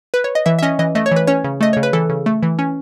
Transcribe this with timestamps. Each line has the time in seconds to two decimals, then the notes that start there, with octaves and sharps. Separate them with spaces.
0.14 B4
0.24 C#5
0.35 D#5
0.46 E3 E5
0.59 E5
0.62 C#4 D#5
0.79 E3 D#5
0.95 A3 D#5
1.06 C#5
1.11 E3 B4
1.27 C#4 C#5
1.44 C#3
1.61 A3 D#5
1.73 C#3 C#5
1.83 B4
1.93 E3 A4
2.09 C#3
2.26 A3
2.43 E3
2.59 C#4